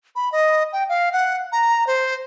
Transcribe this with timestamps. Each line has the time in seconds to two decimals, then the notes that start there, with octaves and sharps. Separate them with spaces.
0.16 B5
0.32 D#5
0.73 G5
0.89 F5
1.13 F#5
1.52 A#5
1.87 C5